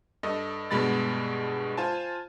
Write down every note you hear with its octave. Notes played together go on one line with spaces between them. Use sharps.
G2 A4 D#5
G2 B2 G#3 B5 A6
F4 C5 G#5 A5